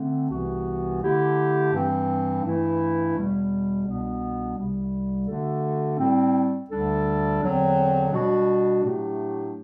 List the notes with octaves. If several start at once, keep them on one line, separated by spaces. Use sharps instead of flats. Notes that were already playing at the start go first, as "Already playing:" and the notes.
Already playing: D3 A3 C4
C2 C3 E3 B3 F#4
D3 A3 E4 G4
G2 E3 G3 C4
G2 E3 A3 E4
E2 B2 G3
C2 B2 G3 B3 D4
C2 C3 G3
D3 A3 D4 F#4 A4
A2 G3 C4
D2 D3 G3 D4 A4
E2 D3 F#3 C4
B2 G3 D4 F#4
A2 F#3 A3 D4 G4